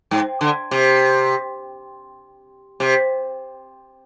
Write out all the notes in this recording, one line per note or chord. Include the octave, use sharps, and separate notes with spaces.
G#2
D3
C3
C3